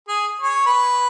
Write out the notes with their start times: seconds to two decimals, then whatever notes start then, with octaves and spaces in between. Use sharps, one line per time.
0.08 G#4
0.41 C#5
0.66 B4